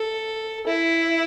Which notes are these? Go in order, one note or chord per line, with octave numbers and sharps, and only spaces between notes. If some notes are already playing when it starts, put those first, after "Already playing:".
Already playing: A4
E4